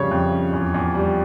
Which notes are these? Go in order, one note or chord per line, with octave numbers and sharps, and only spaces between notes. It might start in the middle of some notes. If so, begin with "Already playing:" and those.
Already playing: F2 C#3 G3 C#4 C#5
F2
C#4
E2
E2
G3